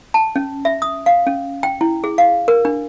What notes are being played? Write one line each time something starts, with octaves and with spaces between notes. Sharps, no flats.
A5
C#4
E5
D#6
F5
C#4
G5
E4
G#4
F5
A#4
D4